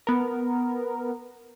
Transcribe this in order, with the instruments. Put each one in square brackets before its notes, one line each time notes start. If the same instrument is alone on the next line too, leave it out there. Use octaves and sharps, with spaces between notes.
[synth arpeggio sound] B3 A#4